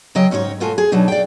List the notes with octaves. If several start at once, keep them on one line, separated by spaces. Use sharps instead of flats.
C#3 F#3 D#5 G5
G#2 C#4 D#4 A#4 C#5
B2 G#3 A3 F4 F#4 G#5
G#4
B2 F#3 D4 D#4
D5 F5 G5